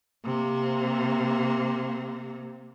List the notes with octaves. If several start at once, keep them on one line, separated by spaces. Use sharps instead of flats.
C3 A#3